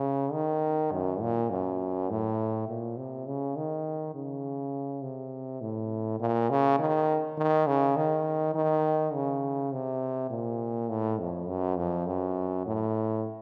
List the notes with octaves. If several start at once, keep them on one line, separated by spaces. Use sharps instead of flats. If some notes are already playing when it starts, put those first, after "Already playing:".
Already playing: C#3
D#3
F#2
A#2
F#2
A2
A#2
C3
C#3
D#3
C#3
C3
A2
A#2
C#3
D#3
D#3
C#3
D#3
D#3
C#3
C3
A#2
A2
F2
F#2
F2
F#2
A2